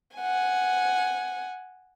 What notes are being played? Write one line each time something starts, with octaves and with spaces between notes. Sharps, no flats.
F#5 G#5